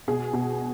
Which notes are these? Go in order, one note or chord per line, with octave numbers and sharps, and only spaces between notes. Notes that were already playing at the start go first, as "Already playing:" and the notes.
B2 G#4
B2